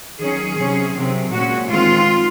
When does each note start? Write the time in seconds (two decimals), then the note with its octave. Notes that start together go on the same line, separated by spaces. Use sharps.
0.20 D#3 F#3 C#4 G#4
0.58 C3 F#3 C#4
0.94 C3 D#3 F#3 C4
1.32 A#2 G#3 C#4 F#4
1.69 D#3 G#3 C4 F4